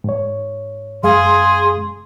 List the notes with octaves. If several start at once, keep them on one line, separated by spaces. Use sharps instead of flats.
G#2 C#5
F#2 G#3 G#4 F5 C6